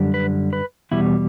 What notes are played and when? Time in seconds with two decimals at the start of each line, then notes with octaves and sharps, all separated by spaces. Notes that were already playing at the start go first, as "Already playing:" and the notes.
Already playing: F#2 D3 G3
0.14 B4
0.53 B4
0.91 E2 B2 G3 E4